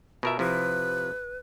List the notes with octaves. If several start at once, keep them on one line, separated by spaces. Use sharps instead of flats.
B2 F4 A#4 E5
C3 F3 E4 B4